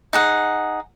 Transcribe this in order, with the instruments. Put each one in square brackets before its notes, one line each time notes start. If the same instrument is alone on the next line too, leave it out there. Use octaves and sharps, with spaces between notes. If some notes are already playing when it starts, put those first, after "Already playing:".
[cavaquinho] D#4 G#4 F#5